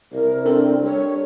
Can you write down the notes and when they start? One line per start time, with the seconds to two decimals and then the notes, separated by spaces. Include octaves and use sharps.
0.12 C2 A#4
0.46 C4 D4 A4 A#4
0.84 G3 C#5